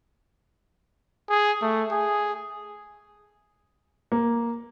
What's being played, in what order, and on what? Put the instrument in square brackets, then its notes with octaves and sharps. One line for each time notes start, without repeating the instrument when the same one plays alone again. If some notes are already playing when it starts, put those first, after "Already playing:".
[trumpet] G#4
A3
G#4
[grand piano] A#3